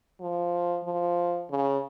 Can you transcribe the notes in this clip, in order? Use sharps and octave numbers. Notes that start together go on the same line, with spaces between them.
F3
F3
C#3